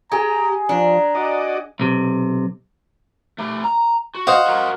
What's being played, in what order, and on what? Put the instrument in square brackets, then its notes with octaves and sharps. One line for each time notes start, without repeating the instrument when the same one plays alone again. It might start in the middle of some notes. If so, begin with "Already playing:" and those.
[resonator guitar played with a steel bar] G4 [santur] G#4 [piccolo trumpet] A#5
[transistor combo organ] F3 [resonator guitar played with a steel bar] D4 [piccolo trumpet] A#5
[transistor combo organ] F#4 D5 D#5
[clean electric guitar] B1 C3
[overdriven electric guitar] A3 G4
A#5
F#4
[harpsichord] C5 D#5 F5 [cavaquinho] F#5
[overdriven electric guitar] F#4 A#4